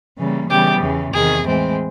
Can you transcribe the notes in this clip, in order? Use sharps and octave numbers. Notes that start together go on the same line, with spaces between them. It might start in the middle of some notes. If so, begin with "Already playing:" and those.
C#3 E3 G3 A#3
C#3 E3 G3 B3 G4
E2 C#3 E3
E2 C3 D#3 G#4
A2 E3 G#3 C4